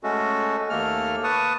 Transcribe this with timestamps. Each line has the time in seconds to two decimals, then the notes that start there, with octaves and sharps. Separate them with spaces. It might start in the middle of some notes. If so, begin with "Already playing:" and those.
0.04 G#3 A3 C#4 F#4 A4
0.70 D#2 A3 A#3 A4 F6
1.24 B4 A5 C#6 D#6